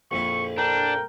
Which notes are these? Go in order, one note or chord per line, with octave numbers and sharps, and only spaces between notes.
A#1 F2 E4 C#6
D4 A#4 G5